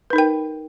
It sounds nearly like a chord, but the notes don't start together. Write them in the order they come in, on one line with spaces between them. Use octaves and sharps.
B4 D#4 A#4 G5